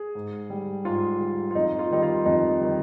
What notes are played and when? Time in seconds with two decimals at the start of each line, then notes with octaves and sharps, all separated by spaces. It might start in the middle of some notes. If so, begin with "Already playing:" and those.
Already playing: G#4
0.15 G#2
0.50 G3
0.85 G#2 F4
1.20 G3
1.51 F4
1.55 F2 D#4
1.79 F4
1.91 D#3 G3 D#4
2.02 F4
2.25 F2 D#4
2.61 D#3 G3